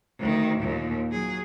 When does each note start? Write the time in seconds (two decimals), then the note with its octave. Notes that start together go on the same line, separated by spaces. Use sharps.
0.19 D2 D#3
0.60 D#2 A#2
1.11 F#3 G#4